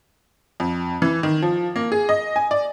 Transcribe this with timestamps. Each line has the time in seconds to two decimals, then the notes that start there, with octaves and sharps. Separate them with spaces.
0.60 F2
1.02 E3
1.23 D#3
1.42 F3
1.76 A#3
1.92 G#4
2.09 D#5
2.36 G#5
2.51 D5